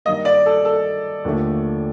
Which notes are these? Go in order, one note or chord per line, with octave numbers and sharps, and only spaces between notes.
G2 D#3 G3 A#3 D#5
D5
A4
A4
D#2 D3 F3 A3